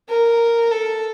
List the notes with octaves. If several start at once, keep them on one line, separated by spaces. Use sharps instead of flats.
A#4
A4